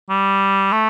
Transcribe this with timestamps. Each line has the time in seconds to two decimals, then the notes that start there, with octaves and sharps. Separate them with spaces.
0.10 G3
0.72 A3